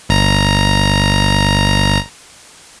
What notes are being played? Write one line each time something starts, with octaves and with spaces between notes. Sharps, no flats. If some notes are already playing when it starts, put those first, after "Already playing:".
G1 A#5